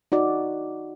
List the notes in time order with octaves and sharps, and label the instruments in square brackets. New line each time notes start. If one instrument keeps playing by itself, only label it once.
[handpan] D#4 F#4 D5